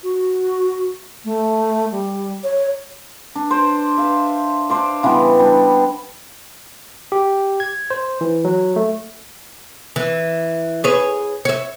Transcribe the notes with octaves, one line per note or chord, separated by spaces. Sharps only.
F#4
A3
G3
C#5
D4
C5 D5
E5 F5
D4 C5 D5 F5
C#3 E3 G3 B3
G3 D4
G4
G#6
C5
E3
F#3
A3
E3
G#4 B4 C#5
C#5 E5